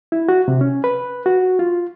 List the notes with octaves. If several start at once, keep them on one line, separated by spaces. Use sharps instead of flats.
E4
F#4
C3
C#4
B4
F#4
F4